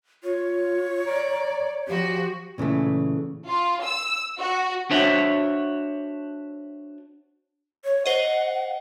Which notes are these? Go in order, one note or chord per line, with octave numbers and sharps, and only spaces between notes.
F4 C#5
D5 A#5
F3 F#4 G4
A#2 C#3 E3 A3
F4
E6
F#4
D4 F#4 C5 C#5 E5 F#5
C#5
C5 D#5 F#5